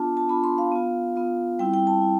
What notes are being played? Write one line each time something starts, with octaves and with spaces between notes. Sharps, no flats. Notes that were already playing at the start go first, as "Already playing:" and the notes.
Already playing: B3 D4 F4 A5
A5
B3 D4 F4 B5
C6
F5
B3 F4
B3 F4
G3 C4 E4 G5
G5
A5
E4